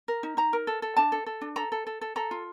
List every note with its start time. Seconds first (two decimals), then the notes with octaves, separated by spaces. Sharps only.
0.08 A#4
0.23 D#4
0.37 D#4 A#5
0.53 A#4
0.67 A4
0.82 A4
0.97 D4 A5
1.12 A4
1.26 A4
1.41 D4
1.56 A4 A#5
1.72 A4
1.87 A4
2.01 A4
2.16 A4 A#5
2.31 F4